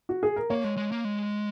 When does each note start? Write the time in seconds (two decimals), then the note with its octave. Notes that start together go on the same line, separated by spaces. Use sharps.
0.09 F#4
0.23 G#4
0.36 A#4
0.50 A#3 C#5
0.64 G#3
0.77 G#3
0.92 A#3
1.05 G#3